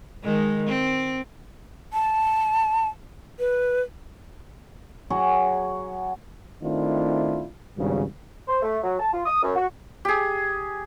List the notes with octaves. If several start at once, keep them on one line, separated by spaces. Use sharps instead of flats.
D#3 G#3
C4
A5
B4
F#3 F#4 G#4 F#5
D#3 A3 C4 D4 E4 F4
G#1 G2 C#3
C5
A3
F#3
A5
F4
D#6
F#2
F#4
G4 G#4